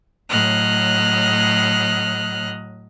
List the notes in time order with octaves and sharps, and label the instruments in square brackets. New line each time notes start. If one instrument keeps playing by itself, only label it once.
[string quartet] A2 F#3 D#5 F6 F#6